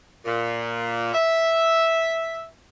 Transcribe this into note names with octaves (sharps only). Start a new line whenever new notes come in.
A#2
E5